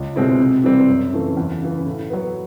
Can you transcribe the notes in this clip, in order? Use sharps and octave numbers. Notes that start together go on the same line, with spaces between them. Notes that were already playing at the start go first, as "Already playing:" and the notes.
Already playing: C#2
B2 G#3 C4 E4
C3
E3 G3 C4
F#2
C#3 E3 A3 C#4
E2
C#3 E3
A2
F#3 B3